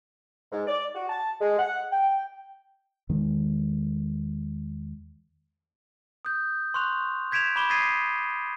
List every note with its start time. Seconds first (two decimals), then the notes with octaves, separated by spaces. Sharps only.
0.52 G#2
0.67 D5
0.95 F#4
1.09 A5
1.41 G#3
1.59 F#5
1.91 G5
3.09 E2 D#3 G#3
6.25 D#6 G6
6.74 C6 C#6 F#6 F7
7.32 G6 G#6 B6 D7 E7 F7
7.56 B5 D6 E7 G7
7.70 D#6 G#6 A6 B6 C7 D#7